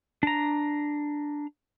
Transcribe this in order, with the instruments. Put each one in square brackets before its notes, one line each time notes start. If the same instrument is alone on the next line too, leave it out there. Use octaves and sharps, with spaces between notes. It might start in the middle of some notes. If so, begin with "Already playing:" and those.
[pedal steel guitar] D4 A#5